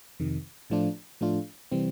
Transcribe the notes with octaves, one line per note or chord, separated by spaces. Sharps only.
F2 C3 D#3
A2 F3 A3 D4 F4
A2 F3 A3 D4 F4
C3 E3 G3 C4